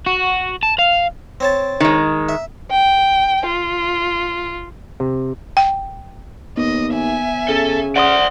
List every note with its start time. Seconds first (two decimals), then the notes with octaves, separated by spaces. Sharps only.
0.06 F#4
0.63 A5
0.79 F5
1.40 C4 C#5 A5
1.80 D#3 G#3
2.29 E5
2.70 G5
3.46 F4
5.00 C3
5.57 G5
6.57 D#2 B3 D#5
6.93 E5 G#5
7.48 C#3 A4
7.96 D5 E5 F#5 C6 D#6